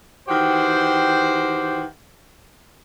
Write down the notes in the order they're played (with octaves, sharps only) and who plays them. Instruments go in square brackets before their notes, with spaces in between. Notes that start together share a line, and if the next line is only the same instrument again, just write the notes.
[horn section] D#3 E3 F#4 G4 C5